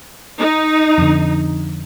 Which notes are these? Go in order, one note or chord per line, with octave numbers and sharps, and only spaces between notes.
D#4
F2 D3